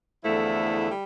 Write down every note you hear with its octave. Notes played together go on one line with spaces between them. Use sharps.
E2 D3 F3 A3 E4
G3